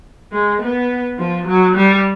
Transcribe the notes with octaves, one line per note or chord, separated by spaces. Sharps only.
G#3
B3
F3
F#3
G3